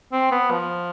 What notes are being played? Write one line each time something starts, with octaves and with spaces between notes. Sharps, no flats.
C4
B3
F3